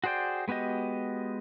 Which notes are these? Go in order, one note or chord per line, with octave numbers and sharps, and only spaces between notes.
F#4 G#4 C5 D5 G5
G#3 B3 F#4 G4 D#5